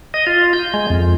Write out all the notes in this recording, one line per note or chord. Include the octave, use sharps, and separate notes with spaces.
D#5
F4
G6
G#3
F2